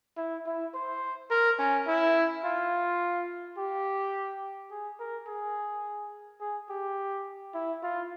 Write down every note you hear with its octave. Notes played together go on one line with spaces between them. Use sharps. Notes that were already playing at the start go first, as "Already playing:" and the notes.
E4
E4
C5
A#4
C#4
E4
F4
G4
G#4
A#4
G#4
G#4
G4
E4
F4